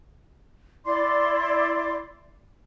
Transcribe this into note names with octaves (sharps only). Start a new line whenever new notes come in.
E4 D5 C6 D6